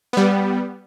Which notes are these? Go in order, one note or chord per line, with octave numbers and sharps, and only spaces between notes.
G3 B3